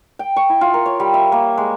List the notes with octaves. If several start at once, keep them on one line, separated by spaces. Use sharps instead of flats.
G5
C#6
E4
F4
A#4
C#5
G3
E5
A#3
G#3